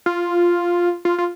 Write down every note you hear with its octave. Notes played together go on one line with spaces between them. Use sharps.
F4
F4
F4